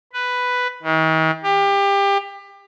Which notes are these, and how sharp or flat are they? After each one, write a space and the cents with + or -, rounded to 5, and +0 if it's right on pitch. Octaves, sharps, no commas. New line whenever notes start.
B4 +5
D#3 +40
G4 +25